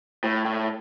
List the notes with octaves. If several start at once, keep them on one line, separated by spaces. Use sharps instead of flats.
A2
A2